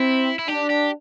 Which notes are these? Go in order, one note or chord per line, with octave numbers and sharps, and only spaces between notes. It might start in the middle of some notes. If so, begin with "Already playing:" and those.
Already playing: C4 E4
E4
D4 G4
G4